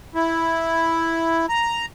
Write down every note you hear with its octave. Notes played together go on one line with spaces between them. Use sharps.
E4
A#5